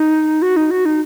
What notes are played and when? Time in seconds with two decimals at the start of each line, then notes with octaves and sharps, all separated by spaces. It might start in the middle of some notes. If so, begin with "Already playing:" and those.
Already playing: D#4
0.42 F#4
0.57 D#4
0.71 F#4
0.86 D#4